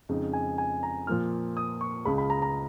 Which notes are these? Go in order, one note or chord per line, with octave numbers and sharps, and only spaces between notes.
F2 C#3 G#3 D#4
G#5
G#5
A#5
A#2 F3 A#3 F4 F6
D#6
C#6
C#2 C#3 G#3 B5
B5
A#5
A#5